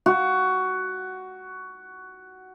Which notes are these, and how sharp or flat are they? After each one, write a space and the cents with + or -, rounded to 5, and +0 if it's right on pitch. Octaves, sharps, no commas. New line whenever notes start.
F#4 +10